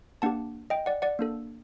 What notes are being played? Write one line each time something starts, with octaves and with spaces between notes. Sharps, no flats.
A#3 D4 G4 F#5 A5
D#5 G5
D5 F#5
D5 F#5
A#3 D4 A4